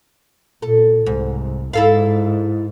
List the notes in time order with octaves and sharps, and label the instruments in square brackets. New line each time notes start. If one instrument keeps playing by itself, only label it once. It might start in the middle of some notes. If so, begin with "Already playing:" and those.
[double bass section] A#2 [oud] A4
[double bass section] C2 [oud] G#2
[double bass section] G#2 [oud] E4 A4 F5